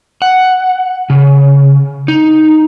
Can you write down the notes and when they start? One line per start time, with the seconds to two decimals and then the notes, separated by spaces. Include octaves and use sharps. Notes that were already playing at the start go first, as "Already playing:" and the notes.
0.22 F#5
1.10 C#3
2.08 D#4